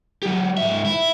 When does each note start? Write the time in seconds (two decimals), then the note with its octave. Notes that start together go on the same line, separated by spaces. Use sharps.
0.23 F#3 G4
0.57 G#2 E5
0.85 E4